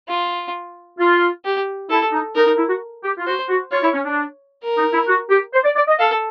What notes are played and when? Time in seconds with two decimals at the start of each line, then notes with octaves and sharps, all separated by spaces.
0.08 F4
0.99 F4
1.45 G4
1.90 E4 A4
2.13 D#4
2.35 D#4 A#4
2.47 D#4
2.58 E4
2.69 F#4
3.03 G4
3.18 F4
3.27 F#4 C5
3.49 F#4
3.72 F4 C#5
3.83 E4
3.94 C#4
4.05 D4
4.63 A#4
4.78 D#4
4.93 E4
5.08 F#4
5.30 G4
5.53 C5
5.64 D5
5.76 D5
5.88 D#5
5.98 A4 F5